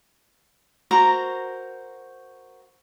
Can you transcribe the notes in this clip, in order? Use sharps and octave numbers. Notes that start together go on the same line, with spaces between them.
F#4 A#4 C5 A#5